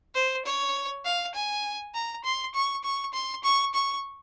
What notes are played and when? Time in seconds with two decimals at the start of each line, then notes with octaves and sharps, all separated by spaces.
0.14 C5
0.45 C#5
1.05 F5
1.34 G#5
1.94 A#5
2.24 C6
2.54 C#6
2.84 C#6
3.13 C6
3.44 C#6
3.74 C#6